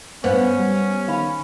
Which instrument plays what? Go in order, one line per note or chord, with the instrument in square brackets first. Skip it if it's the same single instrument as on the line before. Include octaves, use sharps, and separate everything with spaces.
[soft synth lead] G2 [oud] B3 [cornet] C#4 [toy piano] C5 D5 F5
[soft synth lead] G3
[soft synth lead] D#3 [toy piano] F5 B5